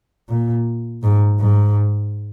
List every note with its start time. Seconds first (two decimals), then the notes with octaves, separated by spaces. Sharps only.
0.29 A#2
1.03 G#2
1.40 G#2